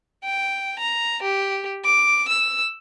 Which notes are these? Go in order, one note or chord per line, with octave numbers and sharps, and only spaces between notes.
G5
A#5
G4
D6
E6